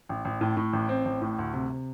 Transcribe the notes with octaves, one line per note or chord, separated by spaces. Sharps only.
A1
A1
A2
A2
A1
C4
A1
A2
D2
C3
C3